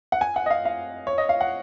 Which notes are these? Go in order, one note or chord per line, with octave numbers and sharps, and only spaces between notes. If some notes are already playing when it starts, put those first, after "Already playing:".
F#5
G#5
F#5
D#5
F5
F5
C#5
D#5
F5
F#5